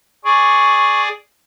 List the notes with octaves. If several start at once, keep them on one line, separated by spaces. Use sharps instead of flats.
G#4 D5 C#6